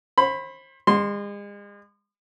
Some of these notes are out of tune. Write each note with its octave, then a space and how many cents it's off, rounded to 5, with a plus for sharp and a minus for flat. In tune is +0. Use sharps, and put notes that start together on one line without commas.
C5 +35 B5 +5
G#3 -40 C6 +0